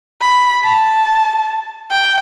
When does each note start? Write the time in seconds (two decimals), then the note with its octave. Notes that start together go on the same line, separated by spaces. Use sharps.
0.21 B5
0.64 A5
1.91 G5